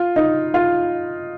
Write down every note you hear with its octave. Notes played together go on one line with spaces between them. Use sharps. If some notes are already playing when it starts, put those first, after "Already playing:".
Already playing: F4
D#4
F4